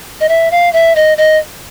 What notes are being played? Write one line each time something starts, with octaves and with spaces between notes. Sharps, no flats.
D#5
E5
F5
E5
D#5
D#5